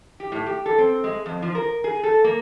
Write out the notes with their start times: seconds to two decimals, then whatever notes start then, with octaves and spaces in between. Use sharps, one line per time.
0.20 G4
0.32 A2
0.46 G4
0.66 A4
0.78 C4
1.04 G#3
1.26 F2
1.42 F3
1.55 A#4
1.84 G#4
2.03 A4
2.24 A#3